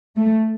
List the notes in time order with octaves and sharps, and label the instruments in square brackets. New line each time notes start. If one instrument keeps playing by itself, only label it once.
[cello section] A3